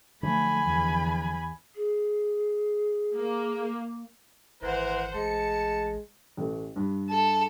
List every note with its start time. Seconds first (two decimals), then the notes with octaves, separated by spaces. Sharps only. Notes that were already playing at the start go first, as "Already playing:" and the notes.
0.23 D3 F3 F#3 A3 G#5 B5
0.63 E2
1.75 G#4
3.13 A#3
4.62 G#1 E3 A#4 C5 F#5
5.15 A1 G#3 A5 C#7
6.37 A1 A3
6.76 G2
7.10 A4